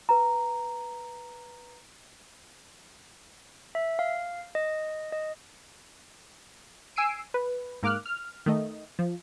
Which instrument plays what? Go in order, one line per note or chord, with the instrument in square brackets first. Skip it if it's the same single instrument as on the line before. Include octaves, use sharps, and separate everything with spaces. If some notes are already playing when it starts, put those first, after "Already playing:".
[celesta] B4 A#5
[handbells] E5
F5
D#5
D#5
[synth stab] G#5 E6 C7 D7 D#7
B4
G#2 A#3 D6 F6 F#6
F6
D#3 A3 D#5
F3